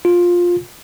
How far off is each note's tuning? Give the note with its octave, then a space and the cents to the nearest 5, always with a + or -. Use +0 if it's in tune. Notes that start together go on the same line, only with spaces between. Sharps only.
F4 +10